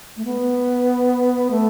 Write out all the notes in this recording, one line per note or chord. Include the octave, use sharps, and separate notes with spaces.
A3
B3
A3